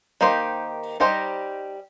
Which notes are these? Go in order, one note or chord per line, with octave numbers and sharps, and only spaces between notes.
D#3 A#3 D#4 G4 C5
G3 D#4 G4 C5 D#5